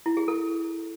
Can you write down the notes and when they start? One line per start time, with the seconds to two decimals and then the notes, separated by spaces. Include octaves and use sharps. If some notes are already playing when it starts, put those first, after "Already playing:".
0.06 E4
0.17 G#4
0.28 A4